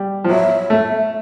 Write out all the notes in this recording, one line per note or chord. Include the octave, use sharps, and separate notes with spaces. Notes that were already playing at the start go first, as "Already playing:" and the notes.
Already playing: G3
F3
F#3 E5
A3